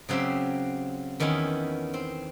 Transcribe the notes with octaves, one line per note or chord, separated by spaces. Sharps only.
C#3 F#3 C4 G4 E5
E2 D#3 B3 C#4 E4
C4